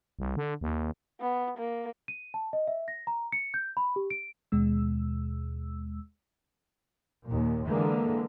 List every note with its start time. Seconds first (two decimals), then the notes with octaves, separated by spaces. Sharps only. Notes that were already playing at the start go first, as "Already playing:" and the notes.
0.19 C2
0.37 D3
0.61 D#2
1.20 B3
1.58 A#3
2.08 D#7
2.34 A5
2.53 D#5
2.68 E5
2.88 A#6
3.07 A#5
3.32 C#7
3.54 G6
3.77 B5
3.96 G4
4.10 D7
4.52 D#2 B2 G#3 E6
7.25 D#2 A#2
7.65 D3 E3 G#3 A#3